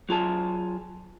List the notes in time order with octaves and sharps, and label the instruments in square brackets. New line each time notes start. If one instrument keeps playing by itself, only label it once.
[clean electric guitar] F#3 F4 G#4 A5